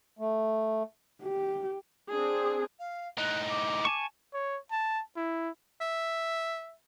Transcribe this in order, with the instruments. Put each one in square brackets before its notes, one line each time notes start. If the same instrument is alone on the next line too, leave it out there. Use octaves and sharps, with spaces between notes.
[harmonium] A3
[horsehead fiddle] G4
[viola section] C4 D4 G#4
[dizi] F5
[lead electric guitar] A2 D#4 [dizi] F#6
[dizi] D6
[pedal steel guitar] G#5 A5 C#6
[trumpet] C#5
A5
E4
[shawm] E5